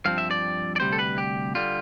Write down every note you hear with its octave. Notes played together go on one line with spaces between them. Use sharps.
G2 F3 C4 F5
E5
D5
D5
D2 C3 G3 C5
A4
B4
G4
D3 G3 F4